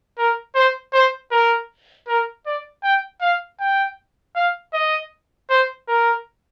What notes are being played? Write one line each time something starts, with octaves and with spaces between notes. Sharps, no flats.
A#4
C5
C5
A#4
A#4
D5
G5
F5
G5
F5
D#5
C5
A#4